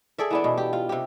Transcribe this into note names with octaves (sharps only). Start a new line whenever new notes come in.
G#4 A4 D5 E5
E3 B3 D4
B2
G4
F4
C3 G4